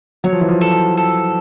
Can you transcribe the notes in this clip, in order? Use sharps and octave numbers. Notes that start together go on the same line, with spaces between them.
F#3 C#5
F3
E3
F3
A4
A4